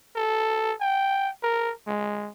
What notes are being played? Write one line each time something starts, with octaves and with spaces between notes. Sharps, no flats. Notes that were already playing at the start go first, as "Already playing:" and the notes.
A4
G5
A#4
G#3